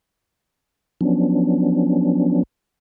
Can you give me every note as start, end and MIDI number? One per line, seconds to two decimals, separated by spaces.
1.01 2.43 53
1.01 2.43 54
1.01 2.43 59
1.01 2.43 61
1.01 2.43 62